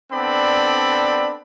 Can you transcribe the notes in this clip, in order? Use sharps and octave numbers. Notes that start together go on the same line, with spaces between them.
B3 C4 D4 A4 D5 B5